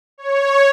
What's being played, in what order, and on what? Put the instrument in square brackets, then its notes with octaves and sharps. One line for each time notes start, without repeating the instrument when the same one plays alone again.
[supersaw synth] C#5